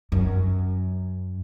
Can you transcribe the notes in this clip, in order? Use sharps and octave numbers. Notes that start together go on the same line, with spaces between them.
F#2